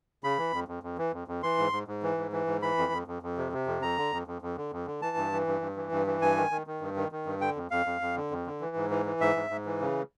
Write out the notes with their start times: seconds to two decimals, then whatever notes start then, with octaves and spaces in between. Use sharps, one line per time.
0.24 C#3 B5
0.38 E3
0.53 F2
0.68 F2
0.83 F2
0.98 E3
1.13 F2
1.28 F2
1.43 E3 C6
1.58 G#2
1.73 G#2
1.88 G#2
2.03 E3
2.18 G#2
2.32 E3
2.47 G#2
2.62 E3 B5
2.78 F2
2.92 F2
3.08 F2
3.23 F2
3.38 C3
3.52 C3
3.67 F2
3.82 F2 A#5
3.97 D3
4.12 F2
4.27 F2
4.42 F2
4.57 D3
4.72 F2
4.86 D3
5.02 E3 A5
5.17 G2
5.32 E3
5.47 G2
5.61 G2
5.76 E3
5.92 G2
6.07 E3
6.21 G2 G#5
6.37 D#3
6.51 D#3
6.67 D#3
6.81 G2
6.96 D#3
7.12 D#3
7.26 G2
7.41 D3 G5
7.56 F2
7.71 F2 F5
7.86 F2
8.01 F2
8.16 D3
8.31 F2
8.46 D3
8.61 E3
8.76 G#2
8.90 E3
9.06 E3
9.20 G#2 E5
9.36 G#2
9.50 G#2
9.66 E3
9.81 C#3